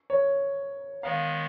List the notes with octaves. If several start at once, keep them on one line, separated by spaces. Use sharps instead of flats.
C#5
D#3 G#3 B3 F5